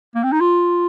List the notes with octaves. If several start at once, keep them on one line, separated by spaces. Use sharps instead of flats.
A#3
C4
D#4
F4